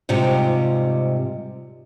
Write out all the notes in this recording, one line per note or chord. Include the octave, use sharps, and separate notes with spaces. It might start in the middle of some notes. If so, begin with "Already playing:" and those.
G#2 C3 G3 F4 G4